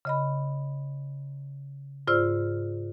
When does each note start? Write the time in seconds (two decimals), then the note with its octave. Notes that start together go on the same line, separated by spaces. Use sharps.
0.05 C#3 D#5 B5
2.07 G#2 F4 C5 D5 E6 F6